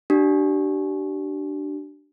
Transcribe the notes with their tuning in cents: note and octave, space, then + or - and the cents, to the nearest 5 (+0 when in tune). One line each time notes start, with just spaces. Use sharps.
D4 +10 G4 -40